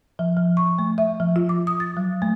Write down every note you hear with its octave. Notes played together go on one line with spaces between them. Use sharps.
F3
F3
C#6
A3
E5
F3
F4
D6
D#6
A6
F#3
A3